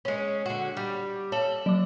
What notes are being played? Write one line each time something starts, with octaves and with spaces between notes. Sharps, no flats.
G#3 C#4
D3 F#4
G3
A4 C#5 F#7 G7
F#3 D6